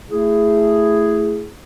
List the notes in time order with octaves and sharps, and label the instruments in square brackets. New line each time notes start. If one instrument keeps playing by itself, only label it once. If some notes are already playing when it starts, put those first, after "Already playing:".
[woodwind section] A3 E4 G#4